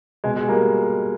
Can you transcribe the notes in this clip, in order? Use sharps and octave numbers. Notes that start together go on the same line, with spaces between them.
B2 G#3
G#3
G3 A#3